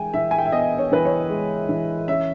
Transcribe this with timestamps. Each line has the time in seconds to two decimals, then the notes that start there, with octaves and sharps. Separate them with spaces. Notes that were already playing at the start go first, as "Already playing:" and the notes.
Already playing: E3 G#3 G5 G#5
0.14 E3 E5
0.31 G#5
0.38 G5
0.45 E5
0.52 B3 D#5
0.78 C#5
0.92 E3 B4
1.05 C#5
1.30 G#3
1.69 E3
2.08 C#4 E5